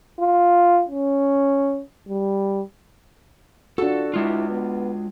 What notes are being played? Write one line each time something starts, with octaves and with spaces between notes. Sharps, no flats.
F4
C#4
G3
D4 F4 F#4 A4
G#3 E4 F4
B3